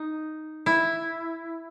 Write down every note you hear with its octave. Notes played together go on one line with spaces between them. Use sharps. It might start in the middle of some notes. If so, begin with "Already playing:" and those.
Already playing: D#4
E4